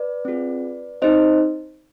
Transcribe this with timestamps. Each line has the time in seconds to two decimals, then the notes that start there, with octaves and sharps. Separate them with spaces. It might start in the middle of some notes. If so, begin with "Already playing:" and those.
Already playing: B4 D5
0.25 C4 F4 G#4
1.02 C4 D#4 G#4 C5 D#5